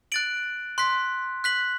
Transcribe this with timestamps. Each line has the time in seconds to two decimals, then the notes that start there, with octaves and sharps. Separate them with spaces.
0.12 F#6 A6 D7 F#7
0.78 C6 F#6 B6
1.44 F#6 B6 F#7